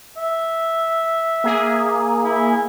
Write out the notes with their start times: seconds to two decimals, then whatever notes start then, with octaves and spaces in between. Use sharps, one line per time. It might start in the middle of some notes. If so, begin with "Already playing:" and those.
0.17 E5
1.44 A#3 G#4
2.24 E4